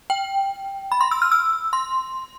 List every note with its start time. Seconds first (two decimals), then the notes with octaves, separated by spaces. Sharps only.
0.10 G5
0.92 B5
1.01 C6
1.11 E6
1.22 F6
1.32 E6
1.73 C6